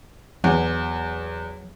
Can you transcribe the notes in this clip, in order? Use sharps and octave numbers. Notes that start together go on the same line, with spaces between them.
E2 F#3